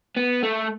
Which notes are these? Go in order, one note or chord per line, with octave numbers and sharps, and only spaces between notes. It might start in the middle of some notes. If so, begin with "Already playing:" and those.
B3
A3